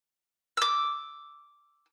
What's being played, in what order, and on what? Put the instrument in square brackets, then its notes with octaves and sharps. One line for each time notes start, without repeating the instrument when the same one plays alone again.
[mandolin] D6 E6